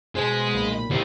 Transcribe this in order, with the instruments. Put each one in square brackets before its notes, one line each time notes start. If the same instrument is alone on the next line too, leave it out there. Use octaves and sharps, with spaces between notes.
[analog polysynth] B2 C5 B6 [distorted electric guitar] G#3
[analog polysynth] B1 A#2 B5
[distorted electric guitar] G3 C5